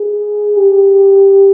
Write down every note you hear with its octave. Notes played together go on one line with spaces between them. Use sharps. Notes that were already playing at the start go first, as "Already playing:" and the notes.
Already playing: G#4
G4